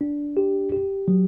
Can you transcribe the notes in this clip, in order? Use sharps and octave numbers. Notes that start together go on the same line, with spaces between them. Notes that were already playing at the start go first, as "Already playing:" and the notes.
D4
G4
G4
F#3